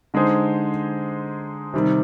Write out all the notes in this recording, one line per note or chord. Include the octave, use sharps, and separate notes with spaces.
D3 G#3 D#4 G#4 C5
C3 D#3 G3